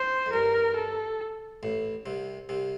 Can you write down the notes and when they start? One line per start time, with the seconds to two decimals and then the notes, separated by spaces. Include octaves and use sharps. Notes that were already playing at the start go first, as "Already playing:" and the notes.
Already playing: C5
0.26 F2
0.33 G2 A#4
0.76 A4
1.63 A1 A2
2.06 C2 C3
2.49 C2 C3